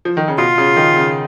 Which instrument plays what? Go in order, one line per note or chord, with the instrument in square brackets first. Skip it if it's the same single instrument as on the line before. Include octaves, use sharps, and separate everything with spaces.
[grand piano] F3
D#3
C#3
[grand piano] B2 [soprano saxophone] F4
[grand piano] C#3
D#3
C#3